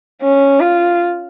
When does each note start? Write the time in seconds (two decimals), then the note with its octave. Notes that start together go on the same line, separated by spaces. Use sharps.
0.22 C#4
0.60 F4